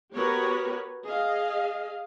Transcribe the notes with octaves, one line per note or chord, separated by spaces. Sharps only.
B3 F#4 G4 A#4 B4 C#5
G#4 D#5 F5